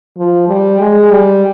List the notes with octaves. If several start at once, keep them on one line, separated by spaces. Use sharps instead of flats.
F3
G3
G#3
G3